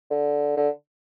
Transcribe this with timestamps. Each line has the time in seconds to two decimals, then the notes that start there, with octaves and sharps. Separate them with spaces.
0.10 D3
0.57 D3